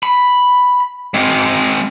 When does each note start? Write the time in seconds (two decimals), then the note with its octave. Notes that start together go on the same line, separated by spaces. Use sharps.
0.03 B5
1.14 G#3 C4